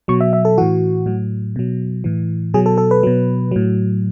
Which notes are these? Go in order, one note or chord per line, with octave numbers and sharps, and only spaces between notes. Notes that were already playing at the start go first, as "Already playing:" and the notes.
B2 F#3 C#6
E5
E5
A4
A2 E3 F#4
A2 F#3
B2 F#3
A2 E3
B2 F#3 G#4
A4
A4
B4
B2 F#3
A2 F#3